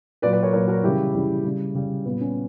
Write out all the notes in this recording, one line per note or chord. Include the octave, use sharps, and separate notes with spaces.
A#2 F#3 B4 D5
B4 D5
A#4 C#5
A#2 F#3 A#4 C#5
F#4 A#4
C#3 E3 G3 E4 G4
C#3 E3 G3
C#3 G3
C#3 G3
A#2 G3 B3
C#4